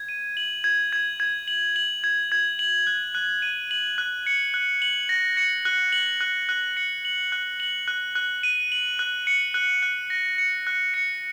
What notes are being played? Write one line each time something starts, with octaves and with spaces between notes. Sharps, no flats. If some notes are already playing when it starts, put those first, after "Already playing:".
Already playing: G#6
D#7
F#7
G#6
G#6
G#6
F#7
F#7
G#6
G#6
F#7
F#6
F#6
D#7
F#7
F#6
C#7
F#6
F#7
A#6
C#7
F#6
F#7
F#6
F#6
C#7
F#7
F#6
F#7
F#6
F#6
D#7
F#7
F#6
C#7
F#6
F#6
A#6
C#7
F#6
C#7